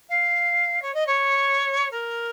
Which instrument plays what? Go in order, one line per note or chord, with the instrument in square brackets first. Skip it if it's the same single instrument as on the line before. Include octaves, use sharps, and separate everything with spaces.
[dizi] F5
C#5
D#5
C#5
A#4